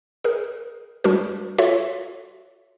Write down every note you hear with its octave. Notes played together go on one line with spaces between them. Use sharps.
G#4 A#4
G3 D4 F#4 A#4
F4 F#4 A4 C#5 E5